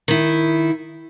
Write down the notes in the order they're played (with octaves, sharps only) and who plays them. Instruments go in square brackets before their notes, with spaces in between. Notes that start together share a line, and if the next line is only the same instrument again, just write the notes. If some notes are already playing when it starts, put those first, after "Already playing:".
[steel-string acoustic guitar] D#3 E4